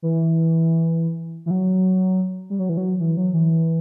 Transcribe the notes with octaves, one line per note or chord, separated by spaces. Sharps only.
E3
E3
F#3
G3
F#3
E3
F#3
E3
F#3
E3